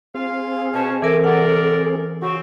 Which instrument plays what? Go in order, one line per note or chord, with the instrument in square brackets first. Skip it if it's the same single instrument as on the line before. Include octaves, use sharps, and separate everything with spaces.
[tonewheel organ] C4 G#4 [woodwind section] F4 F5 C6
[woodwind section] B2 C#4 [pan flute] A5
[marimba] E3 A#4 [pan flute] A4 [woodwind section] E5 G#5 D6
[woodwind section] C3 A#4 D5 [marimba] F#5
[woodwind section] C#3 C4 [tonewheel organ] F#4 [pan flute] C#6